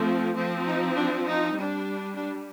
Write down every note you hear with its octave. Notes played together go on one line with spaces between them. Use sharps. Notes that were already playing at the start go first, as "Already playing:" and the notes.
Already playing: F3 A3 C4
F3 C4
D#4
D4
D#4
G3 D4
D4